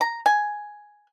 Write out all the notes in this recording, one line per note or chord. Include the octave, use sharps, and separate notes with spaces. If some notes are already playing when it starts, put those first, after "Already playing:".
A#5
G#5